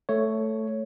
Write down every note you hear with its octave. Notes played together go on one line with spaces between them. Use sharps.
A3 C#5